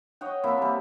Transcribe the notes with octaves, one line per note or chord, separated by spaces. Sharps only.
C#5 D#5 F#5 G5
C3 A#3 E4 E5
G3 A5